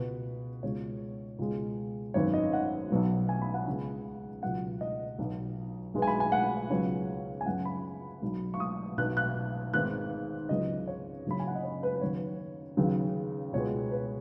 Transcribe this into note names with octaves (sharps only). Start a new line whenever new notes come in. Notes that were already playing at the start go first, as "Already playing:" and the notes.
Already playing: C#2 B2 B3 B4
C#2 B2 G#3 C#5
C#2 B2 G#3
G#1 F#2 D#3 B3 C#5
D#5
F#5
B1 B2 F#3 B3
G#5
B5
F#5
C#2 C#3 G#3 B3
C#2 B2 F#3 B3 F#5
D#5
B1 B2 B3
B1 B2 G#3 B3
G#5
B5
G#5
F#5
C#2 C#3 F#3 B3 C#5
G#5
F#2 C#3 F#3 B3 F#5
B5
B1 B2 F#3
C#6
D#6
B1 B2 B3 F#6
F#6
G#1 G#2 D#3 B3 F#6
C#2 C#3 F#3 B3 D#5
C#5
F#1 F#2 C#3 B5
G#5
F#5
D#5
C#5
B4
B4
D#2 C#3 F#3 B3 C#5
D#2 C#3 F#3 B3
C#2 B2 G#3 B3 C#5
B4